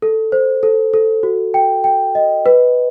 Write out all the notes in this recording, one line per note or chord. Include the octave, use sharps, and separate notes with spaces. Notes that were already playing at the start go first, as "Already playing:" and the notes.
A4
C5
A4
A4
F#4
G5
G5
D#5
B4